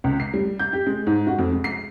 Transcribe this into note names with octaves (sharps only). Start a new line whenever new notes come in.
C#2
C7
G3
G6
G4
G#3
G#2
F#4
F2
G#3
C7